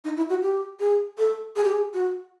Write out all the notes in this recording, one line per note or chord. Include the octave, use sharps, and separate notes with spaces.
D#4
E4
F#4
G4
G#4
A4
G#4
G4
G#4
F#4